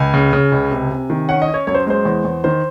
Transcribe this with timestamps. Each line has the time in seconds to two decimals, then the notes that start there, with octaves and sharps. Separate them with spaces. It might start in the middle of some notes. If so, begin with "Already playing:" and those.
Already playing: C#2 G#5
0.14 C#3
0.33 C#3
0.52 C#2
0.71 C3
0.91 C3
1.10 D#3
1.29 C#4 F#5
1.42 D#5
1.48 C#4
1.54 C#5
1.67 F#2 C#5
1.74 C5
1.86 G#3 C5
2.05 E2
2.25 E2
2.44 D#3 C5